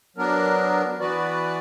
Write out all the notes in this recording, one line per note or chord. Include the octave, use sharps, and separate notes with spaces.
F#3 B3 D4 A#4
E3 B3 F#4 B4 D5